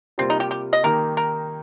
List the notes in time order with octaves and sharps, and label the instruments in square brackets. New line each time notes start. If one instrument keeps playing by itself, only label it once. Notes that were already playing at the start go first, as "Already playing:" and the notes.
[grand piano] C3 G3 A#3 F4 [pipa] C4
[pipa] D#4
G4
G4
D#5
[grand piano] D#3 A#3 D#4 G4 [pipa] A#4
[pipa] A#4